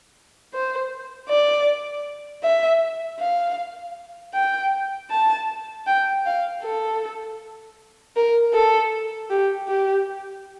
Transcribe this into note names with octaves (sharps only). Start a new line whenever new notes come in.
C5
D5
E5
F5
G5
A5
G5
F5
A4
A#4
A4
G4
G4